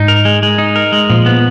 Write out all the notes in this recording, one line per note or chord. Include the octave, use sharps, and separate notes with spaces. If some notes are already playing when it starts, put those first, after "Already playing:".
Already playing: G#2 D#4
A#4
G#3
G#3
D#4
A#4
G#3
A#2 F3
B3